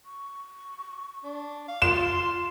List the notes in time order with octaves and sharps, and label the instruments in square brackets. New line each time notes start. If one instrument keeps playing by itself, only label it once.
[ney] C#6
[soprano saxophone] D4
F5
[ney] F4 [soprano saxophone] C6 [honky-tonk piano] E7